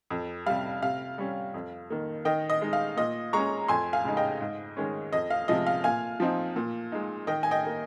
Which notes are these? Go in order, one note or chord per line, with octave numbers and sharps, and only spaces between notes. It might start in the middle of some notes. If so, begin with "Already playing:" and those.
F2
C3 G3 F5
C3 F5
G3 C#4
F2
D#3 A#3
D#3 D#5 G5
D#5
G#3 D#4
F5
A#2 D#5
G#3 C#4 A#5 C#6
F2 G#5 C6
F5 G#5
C#3 G#3 D#4
D#5 G5
G#2
D#3 G#3 C#4
F2 D#5
F5
C3 F3 G#3 D#5
F5
A#2 F5 G#5
F3 C4 D#4
A#2
G#3 D#4
D#3 D#5 G5
G#5
D#5 G5
A#3 D#4